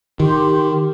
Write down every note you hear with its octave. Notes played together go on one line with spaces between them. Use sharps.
D#3 G4 C6